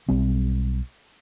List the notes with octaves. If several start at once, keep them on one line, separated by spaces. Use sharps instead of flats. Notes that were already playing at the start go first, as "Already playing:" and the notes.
B1 G3 C4